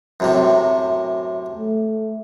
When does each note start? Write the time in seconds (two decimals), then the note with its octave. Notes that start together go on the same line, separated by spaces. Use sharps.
0.20 F#2 A2 C3
1.55 A3